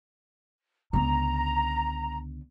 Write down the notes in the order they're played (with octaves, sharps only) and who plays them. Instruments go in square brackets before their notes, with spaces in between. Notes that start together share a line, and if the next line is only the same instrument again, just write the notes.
[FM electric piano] C#2 [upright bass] D3 B3 [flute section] A#5